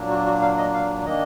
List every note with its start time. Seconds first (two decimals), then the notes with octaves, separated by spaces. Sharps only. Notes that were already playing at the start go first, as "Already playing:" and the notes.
Already playing: A#2 F#3 A#3 D4
0.09 F#4
0.26 F#4
0.42 F5
0.58 D#5
0.74 F5
1.06 D#3 A#3 D4 D#5